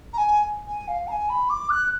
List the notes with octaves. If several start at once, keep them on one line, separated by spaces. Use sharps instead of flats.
A#5
G#5
G#5
F5
A#5
G#5
B5
D6
F#6